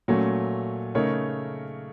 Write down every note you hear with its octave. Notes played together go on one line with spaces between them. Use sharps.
A#2 F#3 A3 C#4
C#3 A3 D#4 A#4 C#5